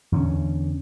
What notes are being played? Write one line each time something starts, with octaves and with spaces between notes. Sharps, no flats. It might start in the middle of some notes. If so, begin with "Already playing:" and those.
E2 D3 A#3 C#4